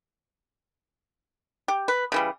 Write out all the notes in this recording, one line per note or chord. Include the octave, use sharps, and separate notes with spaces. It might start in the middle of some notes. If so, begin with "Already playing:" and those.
G4
B4
C#3 E3 G3